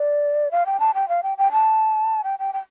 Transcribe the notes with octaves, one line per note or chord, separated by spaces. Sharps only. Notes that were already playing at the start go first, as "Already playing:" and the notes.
Already playing: D5
F5
G5
A5
G5
F5
G5
G5
A5
G5
G5
G5